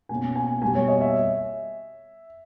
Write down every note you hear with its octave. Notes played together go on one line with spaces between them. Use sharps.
B2 A#3 C#4 G#5
G#5
B2 G3 A#3 G#5
C#5
D#5
E5